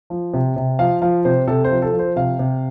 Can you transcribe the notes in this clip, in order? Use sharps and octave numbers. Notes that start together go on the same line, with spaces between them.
F3
C3
C3
F3 F5
F3 F5
C3 C5
C3 A4
C5
F3
A4
F3
C5
C3 F5
C3